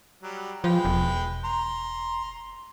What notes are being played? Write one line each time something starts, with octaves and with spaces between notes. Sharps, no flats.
F#3 G3
F3 G#3 B4 G5
E1
A#5 C6